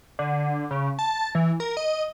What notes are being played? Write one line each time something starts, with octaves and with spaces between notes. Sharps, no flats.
D3
C#3
A5
E3
A#4
D#5